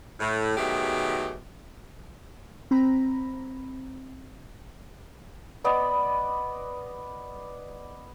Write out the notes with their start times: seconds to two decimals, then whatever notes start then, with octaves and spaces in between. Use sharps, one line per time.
0.19 A2
0.57 B2 D#3 F#3 A3 G4 G#4
2.71 C4 A#5 B5
5.64 B3 D5 D#5 B5